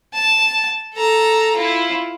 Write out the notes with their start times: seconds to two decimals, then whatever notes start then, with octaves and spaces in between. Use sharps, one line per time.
0.13 A5
0.94 A4 A#5
1.55 E4 F4